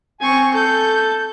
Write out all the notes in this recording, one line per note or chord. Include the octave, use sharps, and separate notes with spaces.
C4 G#5 C#6
A4 G6